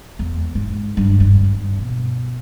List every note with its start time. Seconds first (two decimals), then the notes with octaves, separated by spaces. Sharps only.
0.19 E2
0.55 G#2
0.97 G2
1.18 G#1 G2
1.79 B2